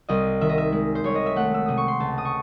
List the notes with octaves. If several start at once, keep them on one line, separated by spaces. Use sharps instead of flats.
C2 D#5
D#3 E5
D#5
E5
G#3
C5
C2 C#5
D#5
E5
A3 F#5
E6
C3 D#6
C#6
C6
C#2 A5
D#6
C#6